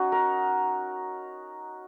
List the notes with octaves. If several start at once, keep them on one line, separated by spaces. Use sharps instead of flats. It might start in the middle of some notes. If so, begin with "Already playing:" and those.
Already playing: C#4 D#4 F#4
A#4